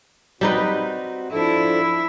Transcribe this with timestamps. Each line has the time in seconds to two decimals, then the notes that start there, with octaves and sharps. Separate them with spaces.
0.41 G3 C4 D#4 F#4 B4
1.32 F3 D4 E4 A4